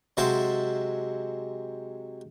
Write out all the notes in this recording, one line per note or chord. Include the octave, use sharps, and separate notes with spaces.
C3 F#3 G#3 C5 E5 A5